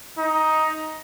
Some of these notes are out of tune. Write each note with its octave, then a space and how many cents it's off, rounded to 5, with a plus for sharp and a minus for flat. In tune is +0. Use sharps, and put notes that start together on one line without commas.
D#4 +10